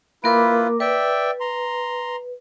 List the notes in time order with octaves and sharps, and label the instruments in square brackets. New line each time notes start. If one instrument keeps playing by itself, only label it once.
[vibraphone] A#3 A#4 D6 [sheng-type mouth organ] E4 F4 B4
[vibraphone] B4 [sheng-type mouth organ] D5 E5 G5
[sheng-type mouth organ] A#5 C6